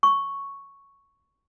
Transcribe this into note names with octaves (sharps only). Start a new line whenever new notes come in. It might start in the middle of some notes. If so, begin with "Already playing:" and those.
C#6